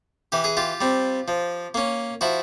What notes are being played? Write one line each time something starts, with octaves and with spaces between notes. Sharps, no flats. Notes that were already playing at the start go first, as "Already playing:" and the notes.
E3 G4
G#4
F4 G4
G3 C4
F3
A#3 C#4
F3 E4 F#4